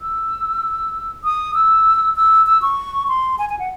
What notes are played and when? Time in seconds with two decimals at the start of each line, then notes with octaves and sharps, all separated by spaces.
0.01 E6
1.24 D#6
1.54 E6
2.16 E6
2.46 E6
2.62 C#6
3.08 C6
3.39 G#5
3.49 G#5
3.59 F#5